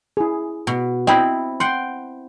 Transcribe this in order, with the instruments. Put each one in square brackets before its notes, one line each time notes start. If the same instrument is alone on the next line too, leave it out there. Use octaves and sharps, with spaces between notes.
[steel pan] E4 G#4
[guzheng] B2
[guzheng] C4 E4 [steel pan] D#5 G5 B5
[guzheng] F#5 G5 [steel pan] C6